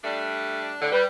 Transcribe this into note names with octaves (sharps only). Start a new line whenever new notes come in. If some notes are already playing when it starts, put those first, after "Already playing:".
G3 A3 D4
A2 D3
G3 B4